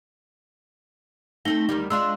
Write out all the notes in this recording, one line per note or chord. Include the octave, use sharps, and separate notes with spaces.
A3 C4 D#4 A4 A#6 G7
D2 D#3 G3
G#3 D4 F4 C6 E6